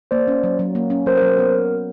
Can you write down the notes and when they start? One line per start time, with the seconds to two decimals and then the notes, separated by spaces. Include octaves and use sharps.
0.11 A#3 C5 D5
0.27 C#4
0.44 F#3
0.59 F#3
0.75 A#3
0.90 C#4
1.06 F#3 A#4 C5
1.17 A#4 C5
1.22 F#3
1.28 A#4
1.38 B3 A#4